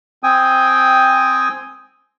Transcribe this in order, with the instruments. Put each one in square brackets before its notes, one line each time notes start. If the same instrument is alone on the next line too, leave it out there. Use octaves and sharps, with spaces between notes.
[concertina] C4 G5 G#5 D#6